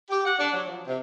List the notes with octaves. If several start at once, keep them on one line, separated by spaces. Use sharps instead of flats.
G4
F#5
D4
F#3
F3
C3